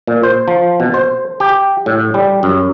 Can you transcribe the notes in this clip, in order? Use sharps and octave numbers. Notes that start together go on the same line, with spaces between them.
A#2
C5
F3
B2
C5
G4
A2
G3
F#2